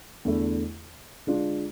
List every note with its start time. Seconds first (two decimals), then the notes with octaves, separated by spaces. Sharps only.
0.25 E2 D3 A3 E4
1.27 D3 G#3 D4 F4